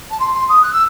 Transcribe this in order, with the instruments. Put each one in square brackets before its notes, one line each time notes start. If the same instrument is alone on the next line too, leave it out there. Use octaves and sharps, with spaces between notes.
[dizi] A5
C6
C6
D#6
F#6
E6